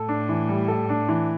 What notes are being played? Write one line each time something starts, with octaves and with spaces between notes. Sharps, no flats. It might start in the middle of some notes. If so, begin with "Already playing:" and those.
Already playing: A2 A4
D4
E3
G3
A4
D4
E3